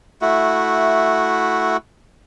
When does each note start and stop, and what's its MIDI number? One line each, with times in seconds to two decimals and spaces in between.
0.22 1.77 57
0.22 1.77 64
0.22 1.77 66